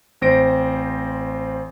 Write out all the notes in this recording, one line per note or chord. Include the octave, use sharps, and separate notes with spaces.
A1 C4 C5 A#6 D7